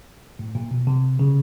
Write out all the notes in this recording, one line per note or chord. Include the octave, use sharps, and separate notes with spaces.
A2
A#2
B2
C3
C#3